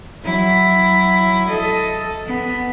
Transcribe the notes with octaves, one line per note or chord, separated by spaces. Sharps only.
F#3 E4
A4 D#5
B3